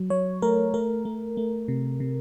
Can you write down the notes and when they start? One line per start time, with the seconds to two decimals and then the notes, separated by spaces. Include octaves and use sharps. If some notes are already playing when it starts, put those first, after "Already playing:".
Already playing: F#3
0.10 F#3 C#5
0.42 A3 A#4
0.74 A3 A#4
1.05 A3
1.37 A3
1.68 C3
2.00 C3